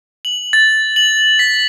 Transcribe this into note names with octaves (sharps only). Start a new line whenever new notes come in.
F#7
A6
F#7
B6